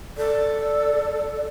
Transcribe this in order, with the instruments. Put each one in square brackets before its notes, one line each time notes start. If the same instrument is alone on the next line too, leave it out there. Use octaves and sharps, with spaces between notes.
[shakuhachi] A4 [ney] D5